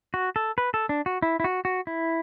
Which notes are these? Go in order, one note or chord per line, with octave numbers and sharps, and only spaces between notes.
F#4
A4
B4
A4
D4
F#4
E4
E4
F#4
F#4
E4